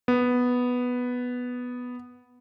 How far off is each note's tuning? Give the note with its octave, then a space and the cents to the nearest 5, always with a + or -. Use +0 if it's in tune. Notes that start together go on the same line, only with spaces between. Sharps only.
B3 +0